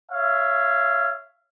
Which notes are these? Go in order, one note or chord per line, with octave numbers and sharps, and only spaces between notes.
C#5 E5 F5